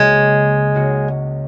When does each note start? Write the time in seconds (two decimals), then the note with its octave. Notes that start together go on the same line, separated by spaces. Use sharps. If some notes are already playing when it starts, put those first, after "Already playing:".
Already playing: C#2 C#3 G#3 A#3 F#4
0.74 C#2 C#3 A#3 F#4